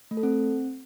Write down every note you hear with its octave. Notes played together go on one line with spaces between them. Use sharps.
A3
A4
C4